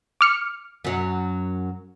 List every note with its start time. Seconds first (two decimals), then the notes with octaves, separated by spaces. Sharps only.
0.21 D6 F6 C#7
0.85 F#2 F#3